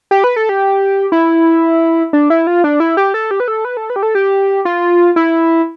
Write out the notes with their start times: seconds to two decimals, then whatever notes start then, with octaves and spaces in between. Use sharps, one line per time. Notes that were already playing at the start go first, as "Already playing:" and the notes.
0.11 G4
0.24 B4
0.36 A4
0.49 G4
1.12 E4
2.13 D4
2.30 E4
2.47 F4
2.64 D4
2.80 E4
2.97 G4
3.14 A4
3.31 G4
3.40 B4
3.48 A4
3.65 B4
3.77 A4
3.90 B4
3.96 G4
4.03 A4
4.15 G4
4.65 F4
5.16 E4